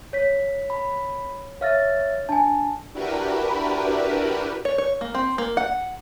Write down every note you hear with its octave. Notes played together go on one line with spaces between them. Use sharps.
C#5 B6
B5
C#5 E5 F5 F6 A6 A#6
D4 G#5 A5
D4 E4 F#4 G4 A#4 B4
C#5
C#5
A#3
C4
A#3
F#5